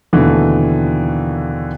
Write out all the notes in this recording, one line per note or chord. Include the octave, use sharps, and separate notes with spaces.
D#2 B2 D3 E3 A3